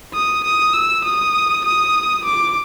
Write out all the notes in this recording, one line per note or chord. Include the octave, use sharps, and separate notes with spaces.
D#6
D#6
E6
D#6
D#6
D6